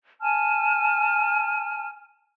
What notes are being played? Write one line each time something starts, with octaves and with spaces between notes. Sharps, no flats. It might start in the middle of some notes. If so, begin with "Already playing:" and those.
G#5 A5 F6